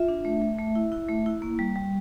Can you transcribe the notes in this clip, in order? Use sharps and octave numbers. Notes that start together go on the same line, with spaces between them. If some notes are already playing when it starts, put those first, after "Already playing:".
Already playing: F4 E5
D4
A3
A3
A3
E4
E4
A3
E4
A#3
G3
G3